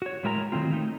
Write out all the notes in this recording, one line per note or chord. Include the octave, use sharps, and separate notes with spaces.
F#4 C#5
A2 G#3 E4 A#4 G#5 A#5
D#3 F#3 A3 C4 F4
A3 D#4